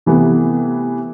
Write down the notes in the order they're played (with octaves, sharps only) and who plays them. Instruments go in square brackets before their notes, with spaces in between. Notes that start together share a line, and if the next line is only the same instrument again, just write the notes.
[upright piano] C3 E3 A3 B3